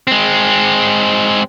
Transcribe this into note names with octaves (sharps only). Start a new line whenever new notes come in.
G#3 C4